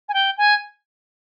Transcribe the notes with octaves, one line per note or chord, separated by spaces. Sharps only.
G#5
G5
G#5